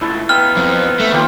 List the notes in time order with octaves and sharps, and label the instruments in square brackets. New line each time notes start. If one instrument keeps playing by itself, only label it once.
[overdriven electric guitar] C#2 A3 [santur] E4 C#6
[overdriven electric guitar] B3 D#4 [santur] E5 F5 G5 [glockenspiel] F6
[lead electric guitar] F2
A3
[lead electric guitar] D#2 [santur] F4 G5 D6